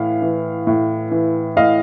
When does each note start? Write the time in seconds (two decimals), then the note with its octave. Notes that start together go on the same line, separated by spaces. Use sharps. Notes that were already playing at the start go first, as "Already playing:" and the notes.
Already playing: A2 E3 F5
0.22 E3
0.67 A2
1.11 E3
1.56 A2 D#5 F5